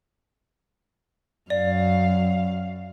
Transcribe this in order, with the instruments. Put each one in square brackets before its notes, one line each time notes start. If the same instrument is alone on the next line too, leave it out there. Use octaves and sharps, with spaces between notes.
[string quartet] F#2 F5 [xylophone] D5